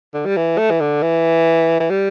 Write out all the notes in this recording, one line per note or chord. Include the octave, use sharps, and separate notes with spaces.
D3
G3
E3
A3
E3
D3
E3
E3
G3